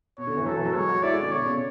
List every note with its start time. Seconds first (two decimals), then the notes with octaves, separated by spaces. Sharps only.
0.18 B2 C#5
0.27 D3
0.37 E3
0.46 F#3 A4
0.56 E3
0.65 F#3
0.75 G#3 C#5
0.89 F#4
1.03 E4 D5
1.13 G#3
1.23 D3
1.31 B2 C#5
1.46 C#3